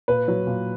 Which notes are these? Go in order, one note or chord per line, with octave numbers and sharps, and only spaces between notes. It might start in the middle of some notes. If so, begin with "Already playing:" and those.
A#2 B4
F#3
A#2